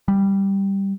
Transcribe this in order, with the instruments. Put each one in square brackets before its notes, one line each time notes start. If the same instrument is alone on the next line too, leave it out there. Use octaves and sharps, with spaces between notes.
[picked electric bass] G3